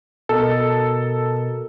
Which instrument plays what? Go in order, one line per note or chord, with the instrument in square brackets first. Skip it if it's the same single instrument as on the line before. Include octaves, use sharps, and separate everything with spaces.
[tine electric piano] B2 A#4 D#5 [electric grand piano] A4